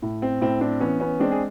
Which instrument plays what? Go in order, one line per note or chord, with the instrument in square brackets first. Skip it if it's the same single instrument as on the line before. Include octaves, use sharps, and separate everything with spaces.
[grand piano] A2
C4
A2 C4
C4 D4
E3 B3 C#4
B3 C#4
G#3 C4 D4
G#4